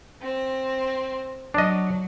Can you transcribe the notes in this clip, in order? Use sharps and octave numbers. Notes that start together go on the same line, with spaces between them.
C4
F#3 D4 D#5